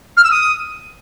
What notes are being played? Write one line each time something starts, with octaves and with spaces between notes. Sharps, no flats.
F6
E6
D#6